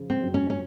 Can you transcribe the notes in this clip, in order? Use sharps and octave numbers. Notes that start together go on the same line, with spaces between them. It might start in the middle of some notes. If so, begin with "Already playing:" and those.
Already playing: C#3 F3
C4
F#2
C#4
C#4